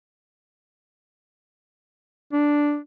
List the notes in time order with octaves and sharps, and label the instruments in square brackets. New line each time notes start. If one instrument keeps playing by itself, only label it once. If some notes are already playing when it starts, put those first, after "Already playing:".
[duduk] D4